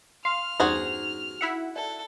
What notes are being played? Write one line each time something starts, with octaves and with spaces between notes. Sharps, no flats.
F5 C6 F6
E2 G2 C#4 D#4 F#4 G#4 C5 A#5
E4 E5 F#5
A4 D5